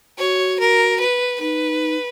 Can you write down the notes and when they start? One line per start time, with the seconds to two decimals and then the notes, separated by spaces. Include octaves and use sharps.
0.18 F#4 C#5
0.59 A#4
1.00 B4
1.40 D#4 B4